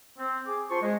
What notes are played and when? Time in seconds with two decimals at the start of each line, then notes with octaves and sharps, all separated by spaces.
0.18 C4
0.46 G#4 D6
0.70 C4 F4 C5 A5 C6 C#6
0.82 G#3